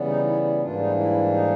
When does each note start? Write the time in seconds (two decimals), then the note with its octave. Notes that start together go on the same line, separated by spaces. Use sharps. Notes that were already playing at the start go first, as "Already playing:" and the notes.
Already playing: C#3 E3 G3 B3
0.08 D#4
0.26 E4
0.43 E4
0.62 G#2 E3 G3 A#3 D4 F4
0.80 D#4
0.97 E4
1.32 D#4